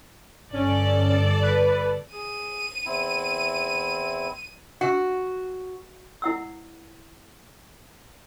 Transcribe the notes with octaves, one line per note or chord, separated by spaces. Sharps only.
G1 C#4 A4 D5
B4
G#4 D#7
E2 C4 E4
F#4
E4 F#5 E6